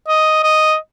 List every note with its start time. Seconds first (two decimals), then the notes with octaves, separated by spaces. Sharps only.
0.08 D#5
0.43 D#5